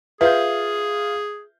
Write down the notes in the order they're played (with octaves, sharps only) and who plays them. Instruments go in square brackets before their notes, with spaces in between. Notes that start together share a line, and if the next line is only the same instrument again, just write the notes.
[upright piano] F4 G6 [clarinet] G#4 [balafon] B4 [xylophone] E5